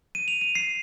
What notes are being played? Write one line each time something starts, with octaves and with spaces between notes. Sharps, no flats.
D#7
F7
D#7
C7